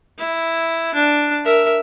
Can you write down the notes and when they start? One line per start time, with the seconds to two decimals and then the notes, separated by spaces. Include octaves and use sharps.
0.19 E4
0.94 D4
1.45 A#4 E5